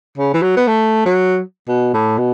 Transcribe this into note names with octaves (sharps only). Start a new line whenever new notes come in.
C#3
E3
F#3
B3
A3
F#3
B2
A2
B2